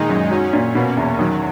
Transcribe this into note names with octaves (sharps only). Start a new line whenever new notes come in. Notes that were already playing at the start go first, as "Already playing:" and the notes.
Already playing: A#2 D#3 G#3 D#4
F#2
F#3 C#4
A#2
B2 A#3
E2
D#3 F#3